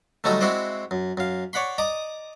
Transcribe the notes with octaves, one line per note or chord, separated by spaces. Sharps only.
D3 F#3 G3 A3 D#4 A4
G#3 C4 E4 F#4 C5 D5
F#2
F#2 F5
C#5 D5 F#5 B5 C6
D5 D#5 A#5 D6 D#6